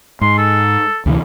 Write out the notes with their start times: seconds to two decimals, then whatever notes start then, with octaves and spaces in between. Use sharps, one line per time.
0.21 G#2 C6
0.38 A4
1.06 D2 C3 E3